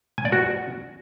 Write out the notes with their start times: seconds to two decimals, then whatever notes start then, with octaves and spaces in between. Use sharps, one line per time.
0.18 G#5
0.25 D5
0.32 F#4